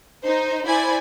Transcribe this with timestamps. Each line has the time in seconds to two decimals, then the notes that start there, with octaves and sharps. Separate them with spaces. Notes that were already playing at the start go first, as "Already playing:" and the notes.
0.24 D#4 C5
0.67 E4 C5 D5 G#5 B5